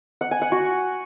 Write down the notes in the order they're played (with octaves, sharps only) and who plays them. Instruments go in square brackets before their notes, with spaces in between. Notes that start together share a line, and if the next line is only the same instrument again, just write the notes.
[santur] F#5
G#5
F#5
F#4